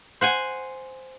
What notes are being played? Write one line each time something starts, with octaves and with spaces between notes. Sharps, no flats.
C5 F#5 G#5